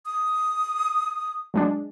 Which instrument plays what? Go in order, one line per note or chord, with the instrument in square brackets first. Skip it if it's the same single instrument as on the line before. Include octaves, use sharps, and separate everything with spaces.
[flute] D#6
[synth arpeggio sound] F#3 G#3 D4